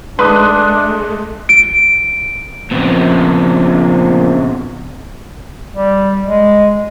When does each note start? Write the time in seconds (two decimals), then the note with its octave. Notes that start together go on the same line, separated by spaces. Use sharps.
0.19 G#3 A3 D4 B4 C6 D#6 F#6
1.49 D7
2.71 A#2 C#3 F3 B3 C4
5.76 G3
6.25 G#3